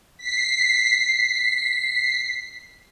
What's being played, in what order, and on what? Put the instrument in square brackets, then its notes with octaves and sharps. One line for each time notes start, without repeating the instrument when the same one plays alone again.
[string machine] B6 C7